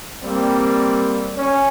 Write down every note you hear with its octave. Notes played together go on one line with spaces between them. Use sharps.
G3 A#3 C4
C#4